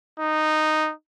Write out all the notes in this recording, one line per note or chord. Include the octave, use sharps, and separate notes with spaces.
D#4